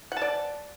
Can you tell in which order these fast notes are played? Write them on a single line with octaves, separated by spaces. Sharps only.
F#5 A5 D5